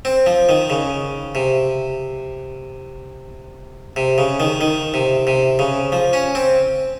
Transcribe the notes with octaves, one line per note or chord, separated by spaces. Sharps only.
C4
F3
D#3
C#3
C3
C3
C#3
D#3
D#3
C3
C3
C#3
F3
C#4
C4